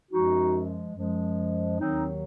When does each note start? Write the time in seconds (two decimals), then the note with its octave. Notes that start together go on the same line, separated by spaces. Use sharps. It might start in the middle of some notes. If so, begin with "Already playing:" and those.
0.10 F#2 F3 G#3 D#4 F#4
0.95 F#2 F3 G#3
1.79 D#2 D#3 F#3 C4 D#4